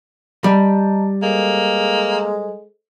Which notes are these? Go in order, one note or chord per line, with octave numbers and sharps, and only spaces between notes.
G3 D#5 A5 A#5
G#3 A#3 A4 C5